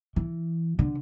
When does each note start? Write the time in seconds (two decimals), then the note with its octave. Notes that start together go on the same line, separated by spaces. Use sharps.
0.16 E3
0.79 D3